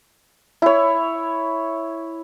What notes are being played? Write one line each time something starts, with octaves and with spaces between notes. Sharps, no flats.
E4 C#5